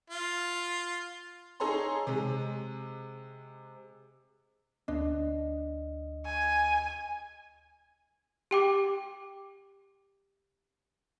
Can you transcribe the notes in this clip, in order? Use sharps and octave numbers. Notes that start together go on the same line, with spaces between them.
F4
D#4 G#4 A4 C#5 A#5 C6
C3 G#3
D2 D4 D#5
G#5
G4 G5 D6